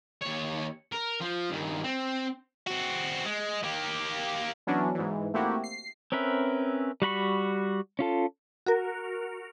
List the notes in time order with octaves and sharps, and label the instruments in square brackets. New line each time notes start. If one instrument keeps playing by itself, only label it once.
[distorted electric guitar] D#2 C#5
A#4
F3
G2 D#3
C4
C4 F#4
G#3
A#3 G4
[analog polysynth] E3 F#3 B3 C#4 D4 F#4
G#2 E3
A3 A#3 C4 E4 F#4 G4
C7
[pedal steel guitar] C4 C#4 A#4 B4 E5
G3 F#4 B5 C#6
C#4 F4 A4
[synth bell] F#4 A#4